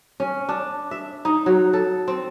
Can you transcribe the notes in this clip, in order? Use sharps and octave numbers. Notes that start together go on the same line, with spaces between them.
C#4
D4
E5
D#4
F#3
A4
C4